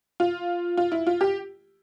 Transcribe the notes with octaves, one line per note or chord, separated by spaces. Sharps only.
F4
F4
E4
F4
G4